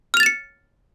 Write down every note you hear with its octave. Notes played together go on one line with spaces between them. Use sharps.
F6 A6 C#7 E7 F7